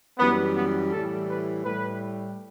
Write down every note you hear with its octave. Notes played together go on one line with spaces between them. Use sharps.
F#2 E3 G3 B3
B3
A2 E3 G3 A4
B4
A2 G3 B4